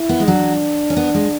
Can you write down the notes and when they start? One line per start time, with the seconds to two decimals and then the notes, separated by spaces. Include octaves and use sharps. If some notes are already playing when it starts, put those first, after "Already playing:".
Already playing: E4
0.09 B3
0.20 G#3
0.27 F#3 D4
0.90 C#4
0.97 B3
1.14 G#3